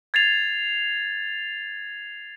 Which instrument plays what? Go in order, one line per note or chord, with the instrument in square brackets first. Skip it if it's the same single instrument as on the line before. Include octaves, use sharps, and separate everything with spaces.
[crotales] G#6 A6 C7 F7